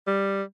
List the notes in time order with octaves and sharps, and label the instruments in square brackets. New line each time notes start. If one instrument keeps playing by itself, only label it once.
[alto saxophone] G3